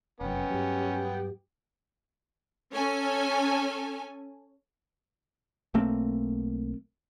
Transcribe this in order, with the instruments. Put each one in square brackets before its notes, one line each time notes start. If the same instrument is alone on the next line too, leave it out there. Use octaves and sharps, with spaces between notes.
[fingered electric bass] F1 F#2 [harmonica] B3 G5 [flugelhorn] C#4
[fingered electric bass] G2 F#3 [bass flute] G4
[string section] C#4 A4 C#5 G#5
[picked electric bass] B1 A3 A#3 C4